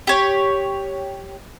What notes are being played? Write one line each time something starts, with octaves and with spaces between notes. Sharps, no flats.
G4 C#5